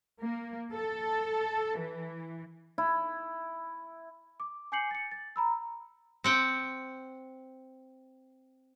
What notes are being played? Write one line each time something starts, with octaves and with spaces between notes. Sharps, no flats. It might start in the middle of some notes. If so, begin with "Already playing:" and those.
A#3
A4
E3
E4
D6
G#5 D6 G6 C7 C#7 F#7
A6 C#7
A6
A#5 B5 E6
C4 F#5 G5